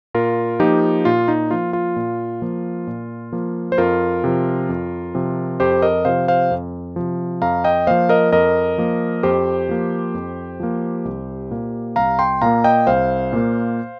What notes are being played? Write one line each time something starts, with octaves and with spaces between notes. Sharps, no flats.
A#2 F4 A#4
F3 A#3 D#4 G4
A#2 F4
D#4
F3 A#3 F4
F4
A#2
F3 A#3
A#2
F3 A#3
C5
F2 F4 A#4
C3 F3
F2
C3 F3
F2 G4 C5
A#4 D#5
C3 F3 C5 F5
C5 F5
F2
C3 F3
F2 F5 A#5
D#5 G5
F3 A#3 C5 F5
A#4 D#5
F2 A#4 D#5
F3 A#3
F2 G4 C5
F3 A#3
F2
F3 A#3
C2
A#2 A#3
C2 F5 A#5
G5 C6
A#2 A#3 F5 A#5
D#5 G5
C2 C5 F5
A#2 A#3